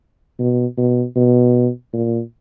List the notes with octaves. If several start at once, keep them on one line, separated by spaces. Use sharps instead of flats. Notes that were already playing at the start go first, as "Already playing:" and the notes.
B2
B2
B2
A#2